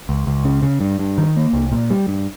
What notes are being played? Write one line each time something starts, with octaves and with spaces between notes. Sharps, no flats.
C#2
C#2
C#3
C#3
G2
G2
D#3
A#3
C2
A#2
G3
G2